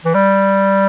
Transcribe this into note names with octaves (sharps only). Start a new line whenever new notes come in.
E3
G3